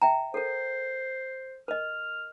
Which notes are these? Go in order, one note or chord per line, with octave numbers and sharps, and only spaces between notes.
E5 G5 A#5
A4 A#4 C5
A#4 D#5 F6